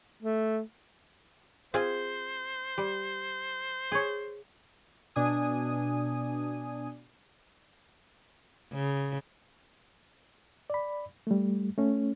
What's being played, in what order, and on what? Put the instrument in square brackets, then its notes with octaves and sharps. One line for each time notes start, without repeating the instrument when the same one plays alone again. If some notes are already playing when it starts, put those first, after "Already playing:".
[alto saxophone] A3
[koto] C4 F4 G#4 [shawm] C5
[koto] G3
G#4 C#5
[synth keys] B2 D4 G#5 D#6
[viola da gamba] C#3
[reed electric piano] D5 B5
G3 A3
A3 C#4